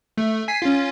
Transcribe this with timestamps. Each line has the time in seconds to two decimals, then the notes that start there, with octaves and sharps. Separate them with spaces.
0.18 A3
0.48 G#5 B6 C7
0.62 C#4 F4